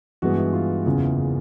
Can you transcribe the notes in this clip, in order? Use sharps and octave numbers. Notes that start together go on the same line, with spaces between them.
G2 E3 G#3 B3 F#4
E4
F4
F#1 E2 C#3 E3